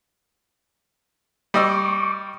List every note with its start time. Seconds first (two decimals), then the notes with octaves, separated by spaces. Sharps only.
1.54 G3 D#5 C#6 D6 E6